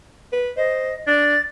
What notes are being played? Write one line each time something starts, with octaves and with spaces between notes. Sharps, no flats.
B4
C5 D#5
D4 A6